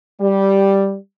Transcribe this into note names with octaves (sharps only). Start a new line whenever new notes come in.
G3